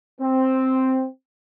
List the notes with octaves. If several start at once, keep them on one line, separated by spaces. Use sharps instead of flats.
C4